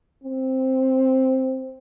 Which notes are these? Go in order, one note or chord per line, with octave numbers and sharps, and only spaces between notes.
C4